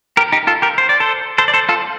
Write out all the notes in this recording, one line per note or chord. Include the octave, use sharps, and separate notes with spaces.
G4 A#4
D#4 G4
F4 A4
G4 A#4
C5
D5
A4 C5
A4 C5
D5
A4 C5
F4 A4